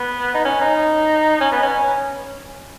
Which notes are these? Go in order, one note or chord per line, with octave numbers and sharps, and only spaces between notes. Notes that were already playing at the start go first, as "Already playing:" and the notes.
Already playing: B3
D#4
C#4
D#4
C#4
B3
C#4